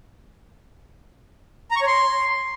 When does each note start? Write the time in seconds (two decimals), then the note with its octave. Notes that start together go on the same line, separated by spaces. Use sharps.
1.71 A#5
1.76 C#6
1.81 C#5
1.87 C6